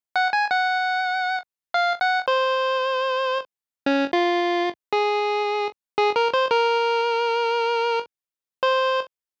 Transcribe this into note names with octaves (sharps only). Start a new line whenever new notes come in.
F#5
G#5
F#5
F5
F#5
C5
C#4
F4
G#4
G#4
A#4
C5
A#4
C5